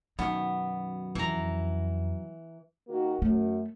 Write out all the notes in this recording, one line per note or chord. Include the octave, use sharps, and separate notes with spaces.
F#2 B2 D#3 B3 D#4
F2 E3 A#5
D#3 A#3 F#4
F#2 A3